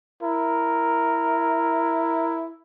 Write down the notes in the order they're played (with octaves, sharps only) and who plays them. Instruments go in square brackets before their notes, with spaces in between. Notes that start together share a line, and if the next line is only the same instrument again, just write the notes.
[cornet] E4 [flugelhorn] A#4